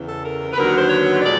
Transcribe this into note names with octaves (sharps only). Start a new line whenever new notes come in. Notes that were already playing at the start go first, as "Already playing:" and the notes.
Already playing: E2 C#3 E3
A4
A#4
B4
D#2 D3 F#3 B3 A#4
C5
C#5
A#2 F3 G#3 D5